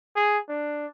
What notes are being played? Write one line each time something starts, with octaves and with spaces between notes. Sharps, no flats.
G#4
D4